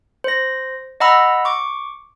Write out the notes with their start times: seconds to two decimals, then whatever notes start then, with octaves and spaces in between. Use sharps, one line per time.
0.24 C5 A#6
1.00 D#5 F#5 A#5 B5 E6
1.45 C#6 D6